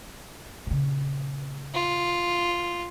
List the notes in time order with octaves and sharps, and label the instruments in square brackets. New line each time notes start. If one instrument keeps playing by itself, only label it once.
[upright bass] A#2 C#3
[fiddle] F4